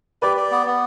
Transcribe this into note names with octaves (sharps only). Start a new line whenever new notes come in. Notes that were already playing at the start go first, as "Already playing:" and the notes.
G4 B4 D5
D5
B3
B3